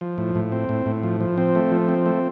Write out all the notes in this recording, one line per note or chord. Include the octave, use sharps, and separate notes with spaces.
F3
A2
A2
C4
A2
A2
F3
F3
C4
A3
F3
C4
A3